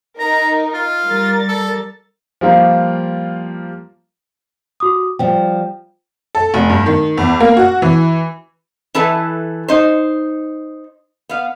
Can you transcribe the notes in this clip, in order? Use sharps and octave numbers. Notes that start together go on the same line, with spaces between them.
D#4 A#4 A#5
F4
G3 A#4 A6
A4
F3 G3 A#3 F4
F#4 D6 D#6
F3 G3 G5
A4
F1
G2
D#3
E2
A#3
F#4
E3
E3 E4 A4 B4 A5
D#4 C5
B3 F5